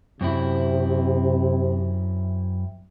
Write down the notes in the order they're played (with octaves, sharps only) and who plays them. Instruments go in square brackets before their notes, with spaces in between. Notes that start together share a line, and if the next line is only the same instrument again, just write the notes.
[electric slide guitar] F#2 C4 E4 [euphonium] C3